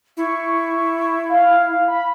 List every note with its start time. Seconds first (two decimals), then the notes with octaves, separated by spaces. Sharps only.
0.17 E4 C#6
1.29 F5
1.88 B5